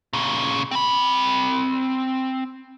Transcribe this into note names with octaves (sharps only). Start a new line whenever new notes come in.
A#2 C#3
C4 B5